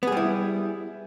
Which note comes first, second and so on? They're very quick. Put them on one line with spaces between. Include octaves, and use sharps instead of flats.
B3 G#4 G3 E4